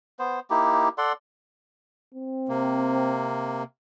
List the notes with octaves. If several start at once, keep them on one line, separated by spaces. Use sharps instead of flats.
B3 C5
A#3 D#4 E4 G4
A4 D5 F#5 C6
C4
C3 A#3